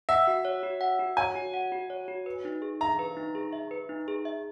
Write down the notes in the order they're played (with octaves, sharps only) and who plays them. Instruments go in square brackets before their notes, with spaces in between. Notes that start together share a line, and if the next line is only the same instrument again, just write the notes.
[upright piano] E5 [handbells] F#5
[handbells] F#4
C#5
F#4
F#5
F#4
[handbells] C#5 [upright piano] G#5
[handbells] F#4
F#5
F#4
C#5
F#4
B4
D#4
G#4
[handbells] E5 [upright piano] A#5
[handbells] B4
D#4
G#4
E5
B4
D#4
G#4
E5